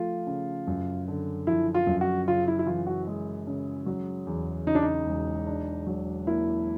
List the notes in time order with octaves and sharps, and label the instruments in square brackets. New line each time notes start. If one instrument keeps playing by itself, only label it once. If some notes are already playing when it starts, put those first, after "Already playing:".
Already playing: [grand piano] F3 A3 [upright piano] F4
[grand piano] C#3
F#2
D3
[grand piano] F3 [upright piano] E4
[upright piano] F4
[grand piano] F#2
[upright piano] F#4
[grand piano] C#3 [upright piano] F4
[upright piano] E4
E4
[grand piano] E3 [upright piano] F4
[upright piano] F#4
[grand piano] G#3
C#3
F#3
E2
[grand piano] C#3 [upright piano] D#4
[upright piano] D4
D#4
[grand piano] E1
D4
F#3
[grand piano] A#3 [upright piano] E4